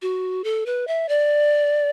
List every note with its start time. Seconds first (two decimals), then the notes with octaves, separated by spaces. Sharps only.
0.02 F#4
0.44 A4
0.66 B4
0.87 E5
1.09 D5